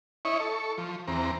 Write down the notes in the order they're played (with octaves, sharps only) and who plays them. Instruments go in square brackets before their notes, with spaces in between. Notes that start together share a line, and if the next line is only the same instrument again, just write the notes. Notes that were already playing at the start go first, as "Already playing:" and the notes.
[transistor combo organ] E4 C#5 D#5 C#6
A4 C#6
F3
E2 C4 A#5